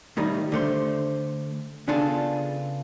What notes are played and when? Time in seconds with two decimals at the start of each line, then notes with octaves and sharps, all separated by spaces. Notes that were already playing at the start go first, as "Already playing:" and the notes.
0.17 A2 D#3 G3 D#4
0.52 D3 A3 C5
1.88 C#3 B3 D4 F4 G#4 A4